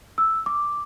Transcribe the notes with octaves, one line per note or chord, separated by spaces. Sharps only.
E6
D6